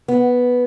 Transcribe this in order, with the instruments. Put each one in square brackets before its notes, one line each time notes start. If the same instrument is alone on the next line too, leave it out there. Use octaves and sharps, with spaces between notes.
[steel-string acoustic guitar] B3